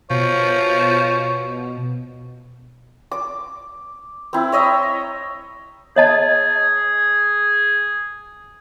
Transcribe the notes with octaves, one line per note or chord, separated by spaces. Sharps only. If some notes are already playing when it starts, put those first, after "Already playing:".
B2 F3 C#5
D6
C4 E4
C#5 D#5 E5 A#5
G#4 C#5 D#5 A5